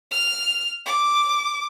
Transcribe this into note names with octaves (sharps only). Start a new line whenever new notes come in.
F6
D6